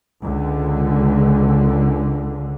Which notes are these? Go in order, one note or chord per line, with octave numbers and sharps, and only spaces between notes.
C#2 D3